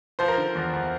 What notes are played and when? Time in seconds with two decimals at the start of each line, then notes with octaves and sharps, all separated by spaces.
0.19 F3 C5
0.28 A#4
0.37 D3
0.55 E2
0.73 E2